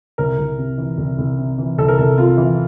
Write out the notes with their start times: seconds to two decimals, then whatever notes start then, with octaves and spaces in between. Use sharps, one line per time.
0.18 C2 A#4
0.38 C2
0.59 C3
0.78 E3
0.98 C2
1.18 C2
1.38 C3
1.58 E3
1.78 C2 A4
1.88 A#4
1.98 C2 A4
2.17 C3 F4
2.37 E3